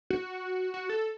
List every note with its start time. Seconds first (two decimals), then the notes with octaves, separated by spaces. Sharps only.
0.10 F#4
0.74 F#4
0.90 A4